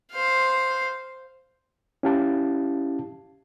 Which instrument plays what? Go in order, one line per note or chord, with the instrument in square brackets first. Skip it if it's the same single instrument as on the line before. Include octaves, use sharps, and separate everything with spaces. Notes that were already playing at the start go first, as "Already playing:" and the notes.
[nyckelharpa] C5 F5
[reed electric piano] C#4 E4 G4 F5 A5